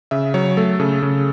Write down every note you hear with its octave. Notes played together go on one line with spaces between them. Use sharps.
C#3 E5
F#3 C#5
A3 A4
C#3 A4
C#3